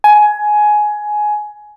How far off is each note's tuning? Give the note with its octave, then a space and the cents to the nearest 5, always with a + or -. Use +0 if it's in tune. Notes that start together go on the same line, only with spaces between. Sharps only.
G#5 +15